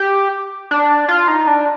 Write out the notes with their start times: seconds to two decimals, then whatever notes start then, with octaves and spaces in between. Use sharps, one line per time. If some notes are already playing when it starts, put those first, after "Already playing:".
Already playing: G4
0.71 D4
1.08 F4
1.28 D#4
1.47 D4